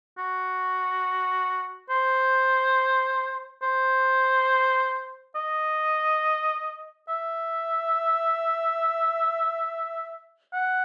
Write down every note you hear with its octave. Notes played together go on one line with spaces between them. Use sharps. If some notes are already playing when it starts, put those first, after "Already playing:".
F#4
C5
C5
D#5
E5
F#5